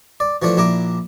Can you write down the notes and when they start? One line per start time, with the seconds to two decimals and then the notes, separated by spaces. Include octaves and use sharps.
0.20 D5
0.42 E3 F3 A3 D4
0.57 A#1 D4 E4 A#5 D6